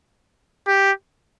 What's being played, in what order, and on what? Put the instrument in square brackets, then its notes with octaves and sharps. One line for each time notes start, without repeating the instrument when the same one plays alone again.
[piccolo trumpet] G4